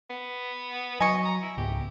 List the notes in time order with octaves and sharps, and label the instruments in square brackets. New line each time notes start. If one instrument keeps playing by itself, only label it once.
[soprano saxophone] B3
[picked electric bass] F#3 [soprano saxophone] D#5 [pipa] G#5 C#6
[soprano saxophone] A#5
E4
[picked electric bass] C#2 G#2 B3 [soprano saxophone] G4